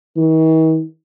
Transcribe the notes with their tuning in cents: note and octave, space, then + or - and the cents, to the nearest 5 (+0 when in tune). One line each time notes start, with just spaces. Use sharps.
D#3 +45